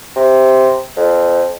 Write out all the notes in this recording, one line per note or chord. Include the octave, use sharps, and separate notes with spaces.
C3
F2